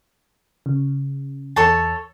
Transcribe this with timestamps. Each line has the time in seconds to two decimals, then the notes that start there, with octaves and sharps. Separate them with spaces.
0.66 C#3
1.56 E2 A4 C#5 A5